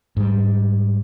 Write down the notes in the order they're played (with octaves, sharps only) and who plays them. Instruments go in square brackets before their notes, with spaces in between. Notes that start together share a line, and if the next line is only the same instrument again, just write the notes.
[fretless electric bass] G#2 G3